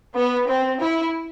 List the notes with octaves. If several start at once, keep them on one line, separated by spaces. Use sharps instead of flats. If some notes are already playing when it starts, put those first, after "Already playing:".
B3
C4
E4